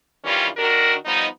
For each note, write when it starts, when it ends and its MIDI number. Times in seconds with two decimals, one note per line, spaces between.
0.24 0.47 43
0.24 0.47 51
0.24 0.47 52
0.24 0.47 55
0.24 0.47 61
0.24 0.47 65
0.57 0.95 51
0.57 0.95 62
0.57 0.95 66
0.57 0.95 70
1.06 1.26 53
1.06 1.26 55
1.06 1.26 59
1.06 1.26 63